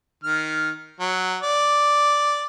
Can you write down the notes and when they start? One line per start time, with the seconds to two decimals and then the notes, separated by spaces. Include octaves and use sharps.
0.24 D#3 F6
1.00 F#3
1.43 D5